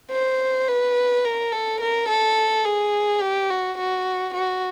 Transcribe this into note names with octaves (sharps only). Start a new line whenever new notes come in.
C5
B4
A#4
A4
A#4
A4
G#4
G4
F#4
F#4
F#4